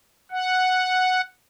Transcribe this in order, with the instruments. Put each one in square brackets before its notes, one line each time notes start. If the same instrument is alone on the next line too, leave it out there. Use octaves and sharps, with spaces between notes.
[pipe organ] F#5